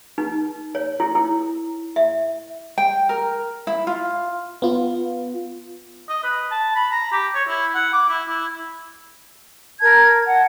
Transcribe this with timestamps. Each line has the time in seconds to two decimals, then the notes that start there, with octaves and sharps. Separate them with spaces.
0.18 D#4
0.75 C#5
1.00 E4
1.15 E4
1.96 E5
2.78 G5
3.09 A#4
3.67 E4
3.87 F4
4.62 B3 F4
6.09 D#5
6.24 B4
6.51 A5
6.76 B5
6.92 A#5
7.12 G4
7.35 C#5
7.48 E4
7.75 F#5
7.93 D6
8.09 E4
8.28 E4
9.80 A#4 A5 G#6
10.26 F#5 A5